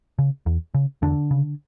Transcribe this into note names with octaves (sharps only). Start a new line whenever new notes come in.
C#3
E2
C#3
E2 D3 D4
C#3